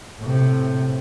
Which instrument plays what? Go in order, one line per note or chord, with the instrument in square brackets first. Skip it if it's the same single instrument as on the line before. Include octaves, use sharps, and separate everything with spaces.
[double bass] A2 C3